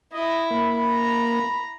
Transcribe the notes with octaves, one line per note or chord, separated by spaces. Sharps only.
E4 D#5
A#3 B5
A#5